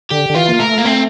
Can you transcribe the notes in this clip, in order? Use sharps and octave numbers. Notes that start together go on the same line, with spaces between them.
D3 G4
D3
E3 F4
A#3
A3 A#4
A#3
C4